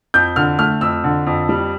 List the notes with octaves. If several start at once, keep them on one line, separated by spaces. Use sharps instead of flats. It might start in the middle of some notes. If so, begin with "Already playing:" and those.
F2 G6
D3 F6
A3 F6
F2 E6
D3
F2
G3